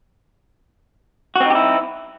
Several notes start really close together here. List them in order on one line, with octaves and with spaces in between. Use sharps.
F#4 C4 D#4 G4 E4